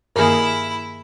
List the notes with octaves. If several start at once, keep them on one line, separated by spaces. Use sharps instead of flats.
G2 D#3 A#3 E4 G#4 A#4